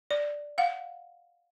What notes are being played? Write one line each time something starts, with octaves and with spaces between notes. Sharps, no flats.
D5
F5 F#5